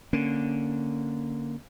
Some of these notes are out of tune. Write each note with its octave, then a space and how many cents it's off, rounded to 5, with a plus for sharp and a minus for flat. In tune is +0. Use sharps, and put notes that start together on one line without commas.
D3 +0 A#3 +0 C#4 +0